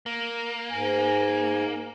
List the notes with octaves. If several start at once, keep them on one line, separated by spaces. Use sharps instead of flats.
A#3
G#2 G#5